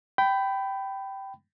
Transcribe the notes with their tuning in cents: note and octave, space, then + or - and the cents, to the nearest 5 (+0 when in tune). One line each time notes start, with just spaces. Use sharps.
G5 -10 B5 +15